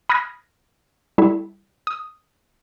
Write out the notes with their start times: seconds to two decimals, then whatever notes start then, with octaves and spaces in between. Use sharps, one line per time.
0.09 B5 D#6 F6 F#6 G#6 A#6
1.18 G3 E4 A4
1.87 D#6